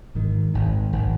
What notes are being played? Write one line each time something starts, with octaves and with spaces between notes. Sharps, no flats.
G#1 G#2 D#3
G#1 G#2 D#3
G#1 D#3